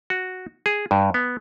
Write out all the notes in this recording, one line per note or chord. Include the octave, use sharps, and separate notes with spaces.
F#4
G#4
G2
B3